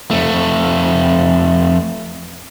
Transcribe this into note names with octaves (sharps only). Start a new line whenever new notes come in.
F2 A3